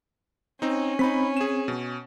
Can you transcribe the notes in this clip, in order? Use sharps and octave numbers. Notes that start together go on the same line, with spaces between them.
C4 C#4 D#4
C4 D#4 B5 B6
G#4 E7
B2